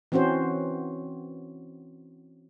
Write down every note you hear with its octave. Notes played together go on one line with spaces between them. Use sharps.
E3 C4 C#4 F#4 C5